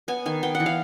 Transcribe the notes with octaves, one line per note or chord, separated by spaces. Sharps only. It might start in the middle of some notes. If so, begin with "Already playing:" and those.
B3 G#5
D#3 G#5
B3 G5
F#5
E3
F5